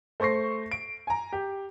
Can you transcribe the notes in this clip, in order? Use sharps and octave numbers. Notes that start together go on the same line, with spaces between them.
A3 C5 C#6 A#6 C7
D7
G#5 A#5
G4